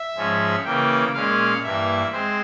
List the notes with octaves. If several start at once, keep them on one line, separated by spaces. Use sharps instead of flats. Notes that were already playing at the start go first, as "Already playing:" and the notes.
Already playing: E5
G#2 F3 G#3 C#4
C#3 E3 A#3 G5
A#2 G#3 C#4 F5
G2 E3 A#3 E5
G#3 C4 C5